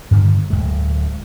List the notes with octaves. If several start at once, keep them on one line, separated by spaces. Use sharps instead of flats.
G2 D3 D#3 G3
D1 E2 G#3